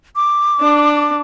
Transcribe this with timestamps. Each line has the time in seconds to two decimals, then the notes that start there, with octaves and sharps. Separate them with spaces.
0.16 D6
0.61 D4